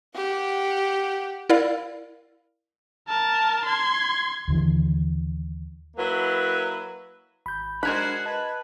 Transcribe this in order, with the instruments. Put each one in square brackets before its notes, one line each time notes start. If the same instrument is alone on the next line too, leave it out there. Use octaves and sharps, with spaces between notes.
[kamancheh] G4 F#5
[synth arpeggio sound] E4 A#4 D5 F5
[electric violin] A#4 A5
C6 G#6
[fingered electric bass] D#2 D3 E3
[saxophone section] F#3 A#3 E4 B4
[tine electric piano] G#1 G6 [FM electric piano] B5
[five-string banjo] G#3 A#4 B5 [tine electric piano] D4 [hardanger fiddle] F#4 C5 [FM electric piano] F#6 G#6
[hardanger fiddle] B4 [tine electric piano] D#5 A5